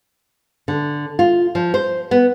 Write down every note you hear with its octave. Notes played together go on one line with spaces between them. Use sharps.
D3
F4
F3
C5
B3